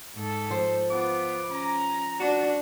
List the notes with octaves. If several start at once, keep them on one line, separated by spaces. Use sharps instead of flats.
G#2 A4
F3 C5
B3 F4 D6
C#4 A#5
D4 F#4